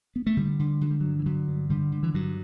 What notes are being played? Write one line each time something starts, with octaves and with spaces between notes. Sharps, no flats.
B3
A3
D3 G3
D3
D3 F#3
G3
G2 F#3
E3
D3 F#3
G2
D3 G3
D3
E3
G2 F#3